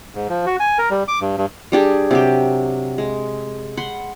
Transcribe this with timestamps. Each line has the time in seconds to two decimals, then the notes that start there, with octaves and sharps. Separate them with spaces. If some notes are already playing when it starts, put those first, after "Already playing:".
0.15 G#2
0.29 F3
0.46 F#4
0.60 G#5
0.78 A#4
0.90 G3
1.08 D6
1.21 G2
1.37 G2
1.72 G3 D4 G4 G#4
2.11 C3 F#3 G4
2.98 G#3
3.77 F#5 B5 C6